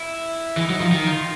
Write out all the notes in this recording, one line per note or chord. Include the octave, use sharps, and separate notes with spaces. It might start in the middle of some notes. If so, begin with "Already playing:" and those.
Already playing: E4
E3 D#4
F#3
F3
D#3
F4